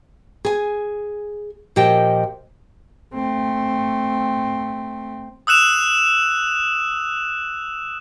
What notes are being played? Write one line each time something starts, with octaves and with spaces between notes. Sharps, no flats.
G#4 G#5
A#2 F3 G4 D#5 G5
A3 C4
D#6 E6 F#6 E7 F7